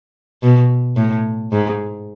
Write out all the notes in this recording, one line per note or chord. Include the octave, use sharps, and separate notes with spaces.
B2
A2
G#2